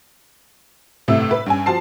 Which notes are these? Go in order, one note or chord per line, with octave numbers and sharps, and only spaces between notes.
G1 A2 C3 A3 E6
B4
G2 C#4 G#5
F3 F#4 C5 A5 C7